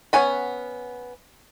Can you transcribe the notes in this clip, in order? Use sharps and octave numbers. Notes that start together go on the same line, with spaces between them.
B3 C#4 F#5 G#5 B5